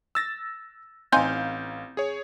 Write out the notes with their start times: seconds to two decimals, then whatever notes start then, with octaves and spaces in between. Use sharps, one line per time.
0.15 E6 A6 A#6
1.12 A1 C4 D#4 F5 G#5 G6
1.97 G#4 C#5